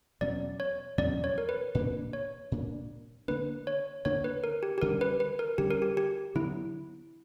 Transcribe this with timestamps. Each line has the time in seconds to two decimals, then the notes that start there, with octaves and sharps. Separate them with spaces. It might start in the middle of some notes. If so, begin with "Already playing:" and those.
0.21 E2 B2 F#3 C#4 D5
0.60 C#5
0.98 E2 B2 F#3 C#4 D5
1.24 C#5
1.38 A#4
1.49 B4
1.75 A#2 A#3 D4 B4
2.13 C#5
2.52 A#2 A#3 D4
3.28 D3 A#3 D4 B4
3.67 C#5
4.05 D3 A#3 D4 C#5
4.24 B4
4.44 A#4
4.63 G4
4.78 G4
4.81 D3 G3 C#4 A#4
5.01 B4
5.20 B4
5.39 A#4
5.58 D3 G3 C#4 G4
5.71 A#4
5.82 G4
5.97 G4
6.35 D3 F#3 B3 E4